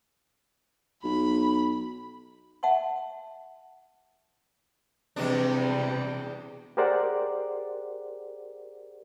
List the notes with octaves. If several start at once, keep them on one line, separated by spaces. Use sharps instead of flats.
B1 B5
E5 F#5 A5 C6
E2 C3 G3 G#3 D4
G4 G#4 A#4 C5 D5 F#5